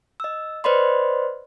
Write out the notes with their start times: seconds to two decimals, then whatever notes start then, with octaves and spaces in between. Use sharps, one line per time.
0.20 D#5 E6
0.64 B4 C5 D5 D#5 B5 C6